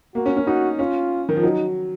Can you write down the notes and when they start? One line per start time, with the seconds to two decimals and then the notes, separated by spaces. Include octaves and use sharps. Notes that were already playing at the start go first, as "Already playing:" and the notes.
0.15 A#3 F#4
0.26 C#4
0.37 C#4
0.47 D#4 F#4
0.79 C#4 F4
1.29 D#3
1.36 F3
1.43 F#3 D#4